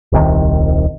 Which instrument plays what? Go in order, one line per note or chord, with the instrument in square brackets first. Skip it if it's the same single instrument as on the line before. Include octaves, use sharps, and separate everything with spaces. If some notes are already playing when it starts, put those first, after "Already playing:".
[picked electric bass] D#1 C2 C3 D#3